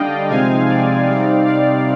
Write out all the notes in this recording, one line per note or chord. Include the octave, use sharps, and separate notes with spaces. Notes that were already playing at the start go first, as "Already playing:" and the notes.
Already playing: D3 G3 D4 D5 D#5 F5 G5
C3 F3 G#3 C4 D#4 F5 G#5
D5 F5
C3 G3 C4 D#4
D5 F5